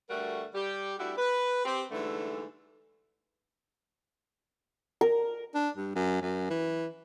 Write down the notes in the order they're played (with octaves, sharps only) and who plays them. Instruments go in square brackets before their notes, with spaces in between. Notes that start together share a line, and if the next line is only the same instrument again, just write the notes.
[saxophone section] D2 G3 A3 F#4 A#4 F#5
G3 G4
G3 A3 D4 E4 F#4 G4
B4
C4 G4
G#2 D3 E3 G3 A3
[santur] A#4
[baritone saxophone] D4
G2
F#2
F#2
E3